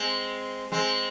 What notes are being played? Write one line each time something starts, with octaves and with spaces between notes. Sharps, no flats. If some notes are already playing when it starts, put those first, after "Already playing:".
Already playing: G#3 C4
G#3 C4